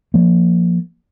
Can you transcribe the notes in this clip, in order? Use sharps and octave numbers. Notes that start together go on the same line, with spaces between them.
F3 A#3